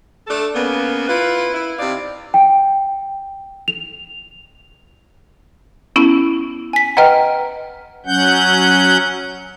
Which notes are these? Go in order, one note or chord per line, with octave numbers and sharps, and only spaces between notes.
A3 D4 A4
C#3 A#3 B3
E4 F4 B4
E4
C3 D#4 D5 F5
G5
F7
B3 C#4 E4
G#5 B6
B4 D#5 F#5 G5 A#5 F6
F#3 C#4 F#5 G6